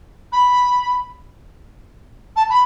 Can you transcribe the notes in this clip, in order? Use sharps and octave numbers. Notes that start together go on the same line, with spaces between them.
B5
A5
B5